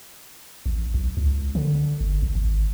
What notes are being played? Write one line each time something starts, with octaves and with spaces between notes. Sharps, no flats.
A1
B1
C#2
D3
G1
A1
G#1